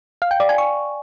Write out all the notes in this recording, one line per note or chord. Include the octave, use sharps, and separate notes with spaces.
F5
G5
D5
G#5
C#6